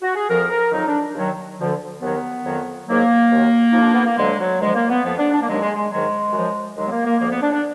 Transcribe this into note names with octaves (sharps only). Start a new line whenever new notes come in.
F#4
G#4
F2 F3 A#4
A#4
F2 D#3 F#3 D#4
D4
D#2 D#3 F#3
D2 D3 F3
D#2 D#3 F#3 B3
F2 D#3 F#3
G#2 D#3 F#3 A#3
D#2 D#3 F#3
F2 F3 D#4
D4
B3
A#3
D2 D3 F#3 G#3
F#3
D2 D3 F3 G#3
A#3
B3
F2 F3 B3
D4
D4
A#3
D#2 D#3 F#3 G#3
G#3
G#3
G#2 D#3 F#3 G#3
F#2 F3
D#2 D#3 F#3 G#3
B3
A#3
A#3
D2 D3 F3 A#3
B3
D4
D4